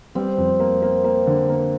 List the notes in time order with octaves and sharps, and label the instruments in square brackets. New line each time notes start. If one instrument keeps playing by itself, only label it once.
[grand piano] G3 [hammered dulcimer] C4
[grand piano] F2
A#3
A#3
A#3
D3
A#3